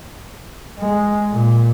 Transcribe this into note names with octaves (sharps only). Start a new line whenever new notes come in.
G#3
A#2